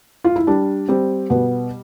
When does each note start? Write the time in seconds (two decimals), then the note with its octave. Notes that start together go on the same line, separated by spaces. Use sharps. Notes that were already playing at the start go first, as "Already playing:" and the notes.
0.24 F4
0.36 E4
0.47 G3 D4
0.88 G3 C4
1.30 B2 B3